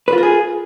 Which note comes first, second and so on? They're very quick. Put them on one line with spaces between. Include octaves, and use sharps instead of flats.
B4 F4 A#4 G#4